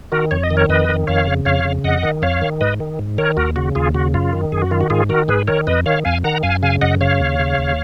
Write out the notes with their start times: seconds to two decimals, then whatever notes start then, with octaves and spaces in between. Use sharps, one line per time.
0.12 D#3 F#4 A#4
0.31 F2 C#5
0.43 D#5
0.51 D#3
0.57 A#4 C#5
0.69 F2 B4 D#5
0.89 D#3
1.07 F2 C#5 F5
1.27 C#3
1.45 F2 C#5 F5
1.65 C#3
1.84 F2 D#5 F#5
2.03 D#3
2.22 F2 C#5 F5
2.41 D#3
2.61 G#2 B4 D#5
2.80 D#3
2.99 G#2
3.18 D#3 A#4 C#5
3.37 D#2 F#4 A#4
3.56 C#3 F#4
3.75 D#2 F4 G#4
3.94 C#3 F#4
4.14 F#2 F4
4.33 D#3
4.52 F#2 G#4
4.62 F#4
4.71 D#3 F4
4.81 F#4
4.90 G#2 F4 G#4
5.09 D#3 F#4 A#4
5.28 G#2 G#4 B4
5.47 D#3 A#4 C#5
5.67 F2 B4 D#5
5.86 D#3 C#5 F5
6.05 F2 F5 G#5
6.24 D#3 F#5 A#5
6.43 F#2 F5 G#5
6.62 C#3 F5 G#5
6.81 F#2 D#5 F#5
7.01 C#3 C#5 F5
7.20 D#2
7.39 C#3
7.58 D#2